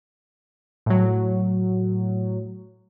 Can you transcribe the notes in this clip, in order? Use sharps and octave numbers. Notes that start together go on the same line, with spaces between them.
A2 F#3